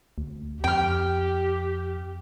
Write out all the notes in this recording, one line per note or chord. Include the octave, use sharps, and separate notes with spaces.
D2
F2 G4 G5 F6